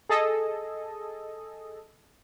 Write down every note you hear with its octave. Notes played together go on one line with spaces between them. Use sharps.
G#4 A4 D#5